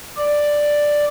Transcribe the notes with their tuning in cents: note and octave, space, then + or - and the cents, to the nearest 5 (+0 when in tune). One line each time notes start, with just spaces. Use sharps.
D5 +5